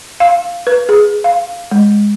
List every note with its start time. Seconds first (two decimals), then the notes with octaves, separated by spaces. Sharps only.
0.20 F5
0.67 B4
0.89 G#4
1.24 F5
1.71 G#3